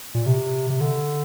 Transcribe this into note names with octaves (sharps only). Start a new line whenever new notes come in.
A#2
C3
C3
D3